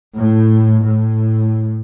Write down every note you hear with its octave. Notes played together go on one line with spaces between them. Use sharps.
A2
A2